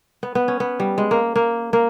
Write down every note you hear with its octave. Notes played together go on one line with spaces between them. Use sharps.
B3
B3
C#4
B3
G3
G#3
A#3
A#3
A#3